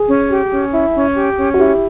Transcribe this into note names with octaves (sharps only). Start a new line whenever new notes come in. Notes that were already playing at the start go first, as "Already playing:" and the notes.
Already playing: G#4
C#4
G4
C#4
E4
C#4
G4
C#4
F#4
E4 G4